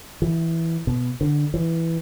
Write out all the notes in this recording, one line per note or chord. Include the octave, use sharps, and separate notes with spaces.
E3
B2
D3
E3